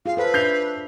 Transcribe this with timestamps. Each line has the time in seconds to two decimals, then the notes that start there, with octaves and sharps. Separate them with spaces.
0.06 F4 G#4 F5
0.17 A4 B4 C5 F5
0.34 D4 E5 G6 C7 F7